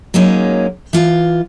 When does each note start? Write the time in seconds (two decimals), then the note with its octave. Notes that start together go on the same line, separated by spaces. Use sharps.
0.14 F#3 G#3 A#3 C#4 D#4
0.93 E3 F4 F5